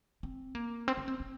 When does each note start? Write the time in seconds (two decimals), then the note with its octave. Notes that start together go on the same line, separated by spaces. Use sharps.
0.23 C4
0.55 A#3
0.88 C4
0.98 C#4
1.08 C4
1.20 C4